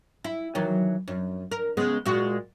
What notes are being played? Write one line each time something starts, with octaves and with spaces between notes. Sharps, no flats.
E4
D#3 E3 F#3
F#2
A#4
C#3 G#3 B3
A#2 G#3 F#4